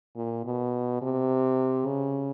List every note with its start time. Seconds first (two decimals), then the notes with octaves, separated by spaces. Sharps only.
0.16 A#2
0.45 B2
1.02 C3
1.86 C#3